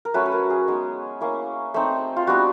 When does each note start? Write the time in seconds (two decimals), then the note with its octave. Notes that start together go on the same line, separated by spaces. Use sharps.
0.05 A#4
0.14 F#3 A3 C#4 B4
0.26 B4
0.32 A#4
0.50 G#4
0.68 G#3 B3 D#4
1.21 A#3 C#4 E4
1.74 A3 C4 D#4
2.16 F4
2.27 G3 B3 D4 F#4